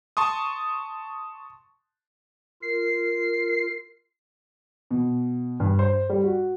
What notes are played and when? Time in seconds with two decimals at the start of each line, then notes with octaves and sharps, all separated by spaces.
0.17 A5 C6 C#6 D#6
2.62 F4 A#4 C7
4.91 B2
5.60 G2
5.79 C5
6.09 G3
6.24 F#4